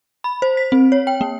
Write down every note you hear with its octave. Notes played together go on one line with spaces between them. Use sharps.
B5
C5
B6
C4
C#5
G5
A#3